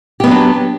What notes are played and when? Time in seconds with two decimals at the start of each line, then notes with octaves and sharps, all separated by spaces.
0.20 G4
0.24 B3
0.27 F#3
0.31 D4